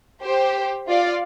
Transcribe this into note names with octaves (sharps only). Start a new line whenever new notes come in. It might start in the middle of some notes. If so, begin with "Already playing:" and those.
G4 C5
F4 D5 F5